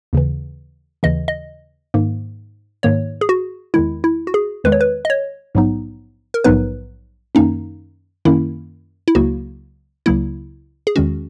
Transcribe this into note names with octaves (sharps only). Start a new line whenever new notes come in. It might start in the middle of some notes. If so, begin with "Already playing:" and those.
D#2 C#3 E3
D#2 C#3 E3 D#5
D#5
G#2 D#3 A#3
G#2 D#3 A#3 C#5
G#4
F#4
E2 D#3 G#3 E4
E4
F#4
G#4
E2 D#3 G#3 B4
C#5
B4
D#5
C#5
A#1 G#2 F#3 B3 D#4
A#4
A#1 G#2 F#3 B3 D#4 B4
F#2 D#3 A#3 C#4 D#4
F#2 D#3 A#3 C#4 E4
E4
C#2 C#3 F#3 A#3 F#4
C#2 C#3 F#3 A#3 E4
G#4
E2 D#3 G#3 C#4 F#4